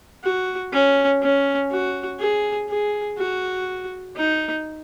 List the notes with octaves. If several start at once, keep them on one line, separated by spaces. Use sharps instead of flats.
F#4
C#4
C#4
F#4
G#4
G#4
F#4
D#4